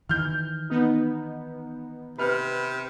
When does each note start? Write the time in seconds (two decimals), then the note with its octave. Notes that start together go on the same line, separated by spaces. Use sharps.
0.09 D#3 E3 F6 G6
0.70 B3 D#4
2.18 C3 B4 F6